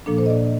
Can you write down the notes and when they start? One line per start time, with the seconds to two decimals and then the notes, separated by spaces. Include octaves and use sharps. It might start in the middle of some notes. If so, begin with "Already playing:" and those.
0.06 A#2 F3 A#3 D4 A4
0.18 C5
0.26 D#5
0.30 D5